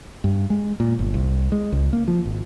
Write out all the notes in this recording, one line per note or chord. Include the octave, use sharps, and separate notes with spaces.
G2
G#3
A#2
G1
C2
G#3
C#2
A#3
F3
G#1